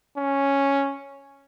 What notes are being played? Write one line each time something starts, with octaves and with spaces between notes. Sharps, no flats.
C#4